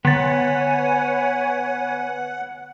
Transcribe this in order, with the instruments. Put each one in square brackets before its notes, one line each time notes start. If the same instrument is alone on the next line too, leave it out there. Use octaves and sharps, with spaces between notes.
[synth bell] D3 A6 [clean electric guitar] B3 [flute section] B4 C#5 G#5 [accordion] F#5